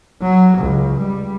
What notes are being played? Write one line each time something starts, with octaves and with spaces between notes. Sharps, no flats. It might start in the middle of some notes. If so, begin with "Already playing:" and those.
F#3
C#2
G3